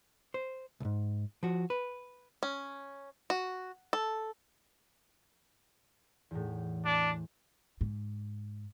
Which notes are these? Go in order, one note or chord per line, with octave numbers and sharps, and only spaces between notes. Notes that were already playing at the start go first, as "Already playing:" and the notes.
C5
C2 G#2
F3 F#4
B4
C#4
F#4
A4
E2 A2
D4
G#2